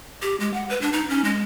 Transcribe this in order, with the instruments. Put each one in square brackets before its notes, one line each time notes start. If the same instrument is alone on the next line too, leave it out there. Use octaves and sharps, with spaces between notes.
[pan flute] G4
G#3
F#5
B4
D4
D#4
C#4
G#3